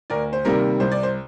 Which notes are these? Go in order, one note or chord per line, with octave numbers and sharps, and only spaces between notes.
D2 A#4 D5
C5
C3 D#3 G3 A#3 A#4
C2 C5
D5
C5